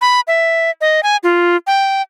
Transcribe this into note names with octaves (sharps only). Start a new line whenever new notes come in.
B5
E5
D#5
G#5
F4
G5